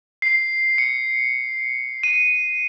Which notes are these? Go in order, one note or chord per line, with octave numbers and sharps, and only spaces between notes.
C7
C#7
D#7